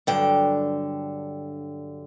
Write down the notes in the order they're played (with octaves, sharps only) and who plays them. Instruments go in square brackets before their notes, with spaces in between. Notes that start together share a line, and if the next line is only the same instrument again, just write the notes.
[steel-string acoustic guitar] G2 D3 F#3 G5